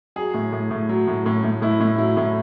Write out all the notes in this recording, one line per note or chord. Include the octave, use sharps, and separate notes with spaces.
F#3 G#4
A2
A2
A2
F#3
A2
A2
A2
A2 E4
A2
F#3 E4
A2